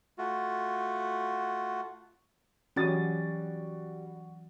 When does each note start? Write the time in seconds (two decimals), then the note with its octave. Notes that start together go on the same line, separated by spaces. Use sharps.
0.18 A3 F4 F#4
2.76 E3 F#3 G3 C#4 F#4 G4 D#6 A6